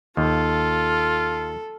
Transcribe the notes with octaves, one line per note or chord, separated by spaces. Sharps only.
D#2 F4 A4